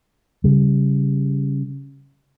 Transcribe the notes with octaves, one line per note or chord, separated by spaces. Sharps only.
C#3 G3